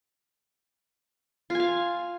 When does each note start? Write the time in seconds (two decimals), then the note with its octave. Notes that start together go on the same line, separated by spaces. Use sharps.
1.50 F4
1.55 G#5
1.60 F5